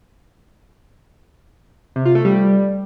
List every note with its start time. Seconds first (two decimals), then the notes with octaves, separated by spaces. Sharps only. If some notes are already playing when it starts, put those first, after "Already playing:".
1.96 C3
2.05 F4
2.15 A3
2.25 G3